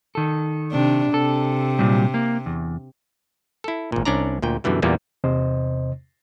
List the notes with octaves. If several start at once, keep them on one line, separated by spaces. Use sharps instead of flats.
D#3 A4
C3 D4
C3 A4
A#2 F#3 G3
A#3
E2
E4 A4
G#1 A#2
C2 C#4 D4 D5 A#5
D2 A#2 G5
F#2 B2 D3 E3 G3
E2 A#2 G3 A#3 B3
E2 C3 C5 D#5